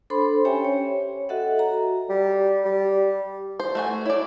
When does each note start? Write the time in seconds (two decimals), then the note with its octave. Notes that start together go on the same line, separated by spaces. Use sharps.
0.10 D4 A4 C5 B5 C6
0.45 C#4 G4 C#5 E5 G5 G#5
0.65 C#5
1.29 F#4 A4 D#5 E5 F#5
1.59 A#5
2.10 G3
2.65 G3
3.60 C5
3.75 A3 F#4 G#5
4.06 E4 C#5 D5